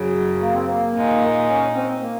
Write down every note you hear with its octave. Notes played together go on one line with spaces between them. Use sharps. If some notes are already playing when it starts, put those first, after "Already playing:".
Already playing: F#2 C#3 F#3
A#3
C4
A#3
A#2 G#3 D#4
C#4
C4
A#3